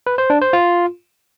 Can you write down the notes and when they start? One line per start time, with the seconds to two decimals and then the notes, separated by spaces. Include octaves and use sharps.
0.07 B4
0.18 C5
0.30 D4
0.42 C5
0.53 F4